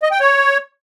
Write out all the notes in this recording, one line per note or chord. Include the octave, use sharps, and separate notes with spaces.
D#5
G5
C#5